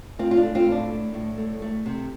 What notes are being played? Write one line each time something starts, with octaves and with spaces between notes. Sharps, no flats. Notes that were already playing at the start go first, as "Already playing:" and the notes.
A2 C4 F4
F4
D4
A3
C4 F4
A2
D4
A3
A2
A3
A3
C3